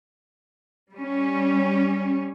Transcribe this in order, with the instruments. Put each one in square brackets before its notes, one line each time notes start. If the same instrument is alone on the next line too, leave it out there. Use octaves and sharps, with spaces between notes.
[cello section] G3 C#4